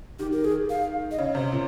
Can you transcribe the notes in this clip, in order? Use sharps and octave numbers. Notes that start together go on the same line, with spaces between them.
D#3 G4
A#4
G#4
F5
D#5
C#3 C#5
C3
A#2